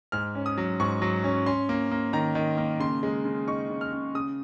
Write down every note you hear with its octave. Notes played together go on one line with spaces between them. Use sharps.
G#2 F6
C#4
D#6
F#3
G#2 C#6
F#3
C#4
C#4 C6
A#3
A#3
D#3 A#5
D#3
A#3
C#3 C6
G#3
C#3
D#4 C#6
C#3
F6
C#3
C#3 D#6